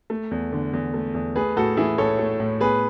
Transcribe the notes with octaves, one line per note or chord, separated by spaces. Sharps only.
A3
E2
D3
E2
A3
E2
A3 G#4 B4
A2 F#4 A4
E3 E4 G#4
A2 A4 C#5
A3
A2
B3 G#4 B4